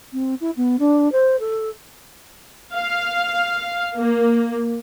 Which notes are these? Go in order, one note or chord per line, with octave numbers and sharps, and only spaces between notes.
C4
E4
B3
D4
C5
A4
F5
A#3